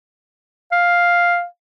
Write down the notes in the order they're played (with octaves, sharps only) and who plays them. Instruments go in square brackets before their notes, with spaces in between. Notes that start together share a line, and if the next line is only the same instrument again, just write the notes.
[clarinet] F5